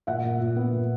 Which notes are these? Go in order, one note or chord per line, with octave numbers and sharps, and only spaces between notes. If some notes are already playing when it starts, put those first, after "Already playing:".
A#2 E5 F#5
A#2
A#2
B3
A#2